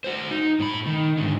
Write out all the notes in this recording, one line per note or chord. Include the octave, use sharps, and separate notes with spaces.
F#4 C5
D#4
A2 B5
D#3
G#2 D3